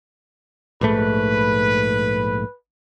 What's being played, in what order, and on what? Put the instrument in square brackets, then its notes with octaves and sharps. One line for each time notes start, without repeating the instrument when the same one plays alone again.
[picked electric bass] A#1 G#2 A3 [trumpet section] B4